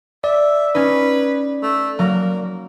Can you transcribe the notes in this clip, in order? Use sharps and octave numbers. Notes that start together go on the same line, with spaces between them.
D5 E5
C#4 D#4 B4
A3
F#3 A#3 A#5